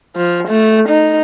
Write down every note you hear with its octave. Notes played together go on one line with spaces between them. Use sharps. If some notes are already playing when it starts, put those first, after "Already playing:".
F3
A3
D#4